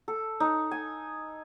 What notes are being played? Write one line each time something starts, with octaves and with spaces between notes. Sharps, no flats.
A4
D#4
G#5